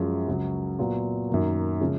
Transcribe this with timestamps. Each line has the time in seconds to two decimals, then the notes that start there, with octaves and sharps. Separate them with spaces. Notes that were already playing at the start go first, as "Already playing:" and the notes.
Already playing: F#2 F3 G#3 C#4 F4
0.28 C#2 C#3 F#3
0.79 A#2 F#3 B3 F4
1.29 F#2 D#3 A#3
1.80 C#3 F3 G#3 C#4